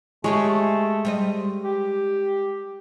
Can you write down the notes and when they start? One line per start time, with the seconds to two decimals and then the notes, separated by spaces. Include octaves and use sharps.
0.24 G#3 A3 G4 G#4 C#5
1.05 G3 C5 D#5
1.65 G4